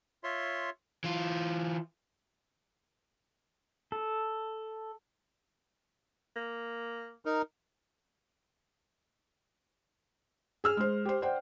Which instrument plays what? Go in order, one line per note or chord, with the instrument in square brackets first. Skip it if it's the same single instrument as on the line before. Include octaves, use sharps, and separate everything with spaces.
[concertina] F4 C#5 E5 C6
[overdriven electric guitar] E3 F4
[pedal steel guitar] A4
[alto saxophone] A#3
[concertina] D#4 A#4
[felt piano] G#4 E6 F6
G#3 C5
G4 C5
C5 D5 F#5 G5